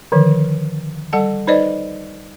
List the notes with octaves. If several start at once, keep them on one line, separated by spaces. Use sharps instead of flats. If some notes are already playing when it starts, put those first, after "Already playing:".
D3 D#3 F3
G3 A4 F#5 A5
D#4 B4 C5 D5 D#5